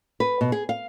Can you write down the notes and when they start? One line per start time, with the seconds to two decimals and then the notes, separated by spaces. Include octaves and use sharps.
0.20 B4
0.41 B2
0.52 G#4
0.69 F5